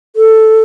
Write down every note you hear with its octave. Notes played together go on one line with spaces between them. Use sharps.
A4